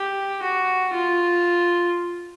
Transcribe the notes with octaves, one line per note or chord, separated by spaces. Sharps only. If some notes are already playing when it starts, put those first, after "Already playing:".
Already playing: G4
F#4
F4